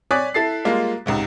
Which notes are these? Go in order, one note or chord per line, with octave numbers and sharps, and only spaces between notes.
C#5 D5 G#5 D6 F#6 B6
E4 A4 A6 C7
G3 G#3 A#3 F4
C#2 G#2 C3